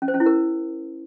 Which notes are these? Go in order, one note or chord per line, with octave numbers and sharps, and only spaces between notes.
C#4
C5
C#4
E4
A#4